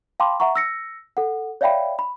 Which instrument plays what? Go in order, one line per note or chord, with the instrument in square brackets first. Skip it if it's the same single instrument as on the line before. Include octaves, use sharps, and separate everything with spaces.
[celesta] F5 G5 A5 B5 C6 D6
E5 F#5 A#5 C#6
E6 A#6 C#7
A4 F#5
C#5 D5 E5 F5 G5 B5
B5